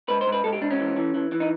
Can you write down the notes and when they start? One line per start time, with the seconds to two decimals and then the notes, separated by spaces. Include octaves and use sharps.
0.08 G#2 B4
0.21 C5
0.27 G#2
0.32 B4
0.44 G#2 A4
0.53 G4
0.61 G#2 D4
0.71 C#4
0.80 E3
0.96 E3
1.14 E3
1.32 E3
1.40 D#4